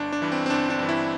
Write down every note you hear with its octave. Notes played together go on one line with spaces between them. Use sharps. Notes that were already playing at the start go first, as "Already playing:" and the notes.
Already playing: G1 D4
D4
G2 E3
C4
C4
G1 D4
D4
G2 E3
E4